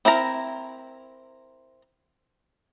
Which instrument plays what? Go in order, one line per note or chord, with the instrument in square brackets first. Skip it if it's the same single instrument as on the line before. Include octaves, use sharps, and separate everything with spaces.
[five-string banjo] C4 E4 A#4 A#5